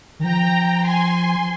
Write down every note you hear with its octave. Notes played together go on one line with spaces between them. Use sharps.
D#3
F3 G5 A#5
G#5 C6